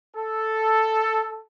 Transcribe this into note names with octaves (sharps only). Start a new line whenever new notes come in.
A4